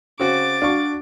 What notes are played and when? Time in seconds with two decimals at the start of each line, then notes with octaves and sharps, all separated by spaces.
0.20 C#3 C4 F#4 D6 A6
0.62 D4 F#4 F5 C#6